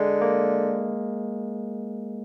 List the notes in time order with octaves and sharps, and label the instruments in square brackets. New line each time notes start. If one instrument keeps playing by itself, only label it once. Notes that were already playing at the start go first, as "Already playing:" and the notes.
Already playing: [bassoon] D3 [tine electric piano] G#3
[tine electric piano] A#3